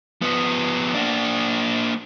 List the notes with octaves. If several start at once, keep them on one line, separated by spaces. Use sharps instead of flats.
F3 B3
A#3 D4